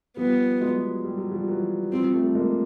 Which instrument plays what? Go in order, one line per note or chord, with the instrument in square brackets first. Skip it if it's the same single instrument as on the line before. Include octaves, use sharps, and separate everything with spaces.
[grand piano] F3 G3 [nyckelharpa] B3
[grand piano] F#3 G#3
G3
F#3
F3 G3
E3 F#3
[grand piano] F3 G3 [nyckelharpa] C4
[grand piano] G3 A3
G#3 A#3